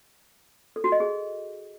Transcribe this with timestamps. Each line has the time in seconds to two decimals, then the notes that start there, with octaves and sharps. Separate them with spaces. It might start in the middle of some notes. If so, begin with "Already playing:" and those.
0.76 A4
0.84 F#4
0.92 D#5
1.00 G#4